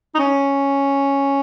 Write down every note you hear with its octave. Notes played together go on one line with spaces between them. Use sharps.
D#4
C#4